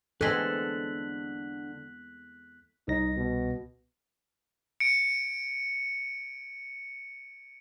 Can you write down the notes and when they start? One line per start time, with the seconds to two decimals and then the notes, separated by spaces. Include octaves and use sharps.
0.21 E2 D3 G#3 C4 A4 F#6 B6 F#7
2.88 C2 D#4 A#6
3.17 B2
4.80 C#7 D7